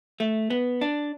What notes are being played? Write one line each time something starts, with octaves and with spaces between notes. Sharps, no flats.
A3
B3
D4